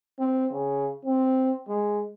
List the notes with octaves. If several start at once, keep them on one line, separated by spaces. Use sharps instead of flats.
C4
C#3
C4
G#3